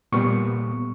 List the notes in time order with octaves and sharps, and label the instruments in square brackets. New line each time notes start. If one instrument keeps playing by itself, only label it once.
[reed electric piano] A#2 G3 B3 C#6